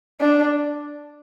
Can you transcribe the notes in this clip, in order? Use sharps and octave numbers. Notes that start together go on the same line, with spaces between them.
D4